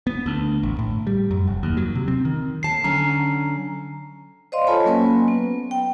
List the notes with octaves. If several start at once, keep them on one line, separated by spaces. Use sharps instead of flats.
B3
D2
A1
A2
G3
F#2
F1
D#2
F#3
C3
C4
D#3
D#2 A5 C7
D3 F#3 C#4 A#5
C5 D5 D#5 F5 C6
F4 A4 C#5 G#5 A5 B5
F#3 A#3 C#4 B4 G#5
B3
G5